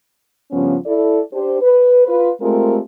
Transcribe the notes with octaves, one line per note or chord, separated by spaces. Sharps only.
G2 C#3 F3 B3 C#4
E4 A4 D5
D4 G4 C5
B4
F4 B4
G#3 A3 C4 F4 G4 A#4